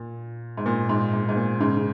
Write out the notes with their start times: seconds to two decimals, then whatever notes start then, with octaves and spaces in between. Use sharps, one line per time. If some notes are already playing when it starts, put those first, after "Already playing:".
Already playing: A#2
0.57 G#2
0.66 A#2
0.89 G#2
1.14 G#2
1.29 G#2
1.36 A#2
1.60 G#2 C#3
1.77 C#3